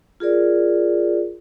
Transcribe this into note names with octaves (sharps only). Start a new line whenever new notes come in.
F4 G#4 A#4 D5